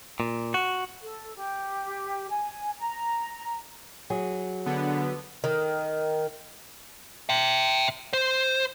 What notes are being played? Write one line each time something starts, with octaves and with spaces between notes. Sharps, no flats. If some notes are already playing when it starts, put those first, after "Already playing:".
A#2
F#4
A4
G4
G#5
A#5
F#3 G#4
D3 B3
D#3
E5 G5
C5